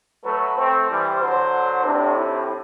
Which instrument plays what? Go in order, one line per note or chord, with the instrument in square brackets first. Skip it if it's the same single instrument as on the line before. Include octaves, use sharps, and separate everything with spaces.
[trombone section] F#3 A3 [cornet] B4
[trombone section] A3 C4 [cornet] C5
[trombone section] E3 G3
[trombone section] D3 F#3 [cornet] C5
[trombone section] A2 C3 [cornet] D4
[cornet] E4